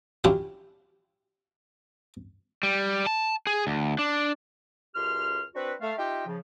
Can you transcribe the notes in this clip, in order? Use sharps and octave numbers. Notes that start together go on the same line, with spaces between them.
F#3 C#4 D4 E4 F4 G4
G3
A5
G#4
D2
D4
C#2 F#2 G4 C6 F6
C4 D4 F#4 B4
A3 F5
D#4 F4 G4 D#5 E5 G5
C#3 F3